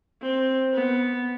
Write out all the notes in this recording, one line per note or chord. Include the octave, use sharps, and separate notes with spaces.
C4
B3